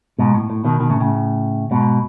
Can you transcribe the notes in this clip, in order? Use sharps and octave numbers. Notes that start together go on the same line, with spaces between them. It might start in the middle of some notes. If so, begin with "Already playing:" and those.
G#2 B2
A2
A2
B2 D#3
B2 D#3
A2 C#3
A2 C#3
G#2 B2